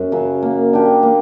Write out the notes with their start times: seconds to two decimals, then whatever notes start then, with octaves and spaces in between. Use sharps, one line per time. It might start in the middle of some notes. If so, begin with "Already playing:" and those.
Already playing: F#2
0.12 C#3 F#3
0.43 A#3
0.73 D4 G4 A#4
1.03 A#3